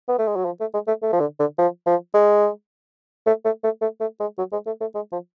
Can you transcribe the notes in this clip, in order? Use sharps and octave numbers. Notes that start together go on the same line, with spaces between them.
B3
A3
G#3
F#3
F3
A3
G#3
A3
A3
F3
D3
D3
F3
F3
G#3
A3
A3
A3
A3
A3
G#3
F#3
G#3
A3
A3
G#3
F3